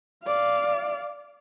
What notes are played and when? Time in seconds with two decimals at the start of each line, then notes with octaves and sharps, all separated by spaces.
0.25 D5 F5